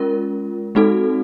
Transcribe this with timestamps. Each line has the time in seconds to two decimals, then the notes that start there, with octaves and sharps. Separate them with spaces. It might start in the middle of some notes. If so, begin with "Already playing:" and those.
Already playing: G#3 C#4 F4 A#4
0.75 G#3 C4 D#4 F#4 A4